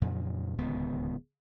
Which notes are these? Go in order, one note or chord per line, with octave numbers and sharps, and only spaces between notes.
F2 A#2 C#3 F#3
D1 C#2 D#3 B3